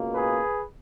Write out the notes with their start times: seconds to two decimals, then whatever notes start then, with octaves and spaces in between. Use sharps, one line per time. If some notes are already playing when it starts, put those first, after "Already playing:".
Already playing: C#2 B2 A#3
0.15 G#4 B4